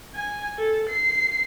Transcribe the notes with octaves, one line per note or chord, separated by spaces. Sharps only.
G#5
A4
C7